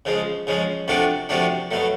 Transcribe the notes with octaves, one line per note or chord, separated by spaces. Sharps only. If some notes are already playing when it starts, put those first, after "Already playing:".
C#3 F3 G#3
C#3 F3 G#3
C3 F3 A3 D4 F#4
C3 F3 A3 D4 F#4
B2 F#3 A3